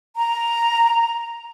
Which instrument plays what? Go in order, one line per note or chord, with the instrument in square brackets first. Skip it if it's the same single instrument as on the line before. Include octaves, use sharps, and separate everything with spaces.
[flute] A#5